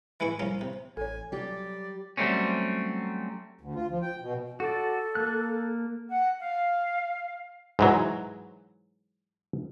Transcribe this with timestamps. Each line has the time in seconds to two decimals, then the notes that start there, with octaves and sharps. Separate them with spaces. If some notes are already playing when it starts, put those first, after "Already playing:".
0.20 E3 G#3 E4 G#5 C#6
0.39 C2 F3 C#4
0.61 C3
0.97 A1 A4 C#5 G#5
1.32 F#3 G3 G4 D5
2.17 F#3 G3 A3 C4 C#4
3.61 D2
3.75 F4
3.90 F3
4.02 G5
4.21 B2
4.60 F#4 A4 D5
5.15 A#3 F#6
6.09 F#5
6.40 F5
7.79 G#2 E3 F#3